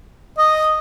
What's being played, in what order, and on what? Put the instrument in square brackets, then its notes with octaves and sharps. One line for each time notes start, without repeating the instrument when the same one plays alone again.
[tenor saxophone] D#5